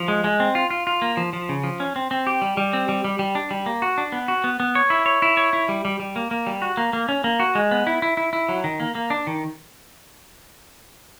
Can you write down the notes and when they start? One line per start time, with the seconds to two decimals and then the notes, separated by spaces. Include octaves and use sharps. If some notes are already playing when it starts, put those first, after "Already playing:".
Already playing: F3
0.08 G#3
0.24 G#3
0.40 C4
0.55 F4
0.70 F4
0.87 F4
1.02 A#3
1.17 F3
1.33 F3
1.49 C#3
1.64 F3
1.80 C#4
1.96 C4
2.11 C4
2.27 G4
2.42 G3
2.57 G3
2.73 C4
2.89 G3
3.04 G3
3.19 G3
3.35 D4
3.51 G3
3.66 A#3
3.82 F#4
3.98 D4
4.12 B3
4.28 F#4
4.44 B3
4.60 B3
4.75 C#5
4.90 E4
5.06 C#5
5.22 E4
5.37 C#5
5.53 E4
5.69 G3
5.85 G3
6.00 G3
6.16 A#3
6.31 A#3
6.47 G3
6.62 F#4
6.77 A#3
6.93 A#3
7.09 C#4
7.24 A#3
7.40 F#4
7.55 G#3
7.71 B3
7.87 E4
8.02 E4
8.17 E4
8.33 E4
8.49 F#3
8.64 D#3
8.80 A#3
8.95 A#3
9.10 D4
9.27 D#3